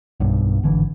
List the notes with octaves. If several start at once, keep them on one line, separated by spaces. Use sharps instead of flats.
B1 G2
G#1 D3 E3